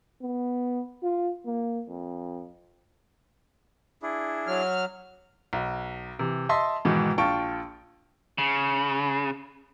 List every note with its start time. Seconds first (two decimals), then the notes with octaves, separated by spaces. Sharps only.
0.21 B3
1.03 F4
1.45 A#3
1.88 F2
4.02 D4 E4 G#4
4.47 F#3 F6
5.53 B1
6.19 C3 E3
6.49 D#5 E5 A5 C6
6.85 G#2 B2 D#3 E3
7.18 A#1 F4 G5 A5 C#6 D7
8.38 C#3